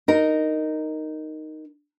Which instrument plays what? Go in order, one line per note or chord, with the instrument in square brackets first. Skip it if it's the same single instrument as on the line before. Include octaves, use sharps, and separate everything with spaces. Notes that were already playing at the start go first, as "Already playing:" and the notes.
[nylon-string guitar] D#4 A#4